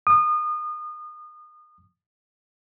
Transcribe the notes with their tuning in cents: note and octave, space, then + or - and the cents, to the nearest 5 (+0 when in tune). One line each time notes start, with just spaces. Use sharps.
D#6 -30